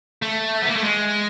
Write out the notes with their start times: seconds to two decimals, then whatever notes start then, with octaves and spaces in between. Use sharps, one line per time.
0.22 A3
0.62 B3
0.68 A#3
0.76 A3
0.83 G#3